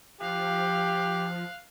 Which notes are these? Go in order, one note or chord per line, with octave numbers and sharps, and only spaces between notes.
F3 G4 F5 F#6